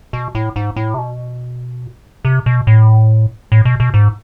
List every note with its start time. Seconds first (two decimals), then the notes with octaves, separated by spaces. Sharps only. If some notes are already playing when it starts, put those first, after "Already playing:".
0.13 B2
0.35 A2
0.56 G#2
0.76 A2
0.94 C3
0.98 B2
2.25 C3
2.46 B2
2.67 A2
3.52 A2
3.65 B2
3.80 B2
3.94 G#2